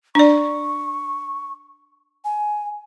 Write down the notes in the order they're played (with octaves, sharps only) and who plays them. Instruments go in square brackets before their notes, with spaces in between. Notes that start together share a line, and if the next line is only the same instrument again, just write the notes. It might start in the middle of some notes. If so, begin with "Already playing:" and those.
[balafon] D4 D5 [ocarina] C#6
[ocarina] G#5